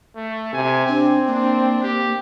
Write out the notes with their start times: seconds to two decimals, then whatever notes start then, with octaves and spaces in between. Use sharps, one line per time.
0.15 A3
0.53 C3 G#5
0.88 C4 D4
1.27 A#3 D4
1.82 G4